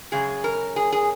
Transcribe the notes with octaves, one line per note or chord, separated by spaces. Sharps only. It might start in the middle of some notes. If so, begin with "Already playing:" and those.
F#2 C#3 G#3 G#4
A#4
G#4
G#4